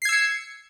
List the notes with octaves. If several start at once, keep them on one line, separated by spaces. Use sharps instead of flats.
E6 G#6 C7 C#7